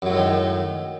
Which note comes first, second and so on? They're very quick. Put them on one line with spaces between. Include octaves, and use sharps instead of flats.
F#2 F#3 A2 G#3 D#3